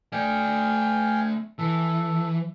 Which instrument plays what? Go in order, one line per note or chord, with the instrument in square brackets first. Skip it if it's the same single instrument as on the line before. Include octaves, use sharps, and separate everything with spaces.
[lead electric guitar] A3 D5 [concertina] F5 G5 G#5
[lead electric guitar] E3 [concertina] A4